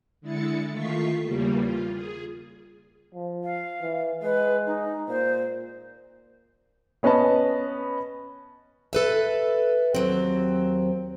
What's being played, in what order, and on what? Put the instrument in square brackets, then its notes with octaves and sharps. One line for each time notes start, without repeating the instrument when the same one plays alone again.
[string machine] D3 G#3 E4 A6 C#7
D#3 A3 F4 C#6 B6 C7
E2 C#3 G3 A#3
F4
G#4
[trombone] F3
[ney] F5
[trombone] E3
[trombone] G#3 [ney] B4
[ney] D#4
[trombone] A#2 [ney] C5
[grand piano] B3 C#4 B4 D#5 A5
[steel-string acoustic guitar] A4 B4 E5
D#2 F#3 C4